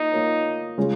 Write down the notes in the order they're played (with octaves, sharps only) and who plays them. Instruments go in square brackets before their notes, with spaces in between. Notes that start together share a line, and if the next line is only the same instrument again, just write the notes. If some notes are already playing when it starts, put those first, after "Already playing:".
Already playing: [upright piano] A#3 F4 [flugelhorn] D#4
[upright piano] A#3 F4 A#4 C#5
C#3 G#3 C#4 F4 G#4